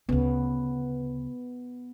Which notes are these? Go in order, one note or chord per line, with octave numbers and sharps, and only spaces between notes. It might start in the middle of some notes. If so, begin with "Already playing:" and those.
D2 C#3 B3